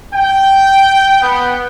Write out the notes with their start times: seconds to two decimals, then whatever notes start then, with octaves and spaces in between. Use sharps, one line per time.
0.14 G5
1.22 B3